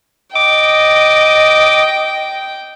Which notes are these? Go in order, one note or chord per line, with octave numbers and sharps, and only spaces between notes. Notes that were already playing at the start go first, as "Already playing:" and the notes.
D#5 G5 D6